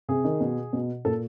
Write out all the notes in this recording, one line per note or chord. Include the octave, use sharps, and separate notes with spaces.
C3 G#4
D#3
B2
B2
A#2 A4